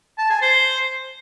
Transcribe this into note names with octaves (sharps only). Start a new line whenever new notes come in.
A5
G#5
C5